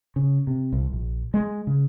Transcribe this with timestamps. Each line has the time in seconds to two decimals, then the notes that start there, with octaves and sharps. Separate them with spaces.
0.16 C#3
0.47 C3
0.73 C2
0.92 A#1
1.34 G#3
1.67 C#3